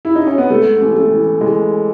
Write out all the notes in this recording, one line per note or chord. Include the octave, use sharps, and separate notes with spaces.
E4
D#4
C#4
B3
G#2 A3
A1
A3
E3
E3 G#3